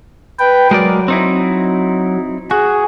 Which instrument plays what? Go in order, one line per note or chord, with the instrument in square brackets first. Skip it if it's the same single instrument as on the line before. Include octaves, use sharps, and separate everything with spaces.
[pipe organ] B4 G5
[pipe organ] F#3 [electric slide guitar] G#3 A#4 D5
[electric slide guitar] C4 D#4 E4
[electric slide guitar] F#4 [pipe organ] G#4